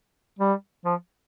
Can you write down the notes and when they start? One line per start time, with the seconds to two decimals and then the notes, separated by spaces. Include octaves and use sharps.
0.39 G3
0.85 F3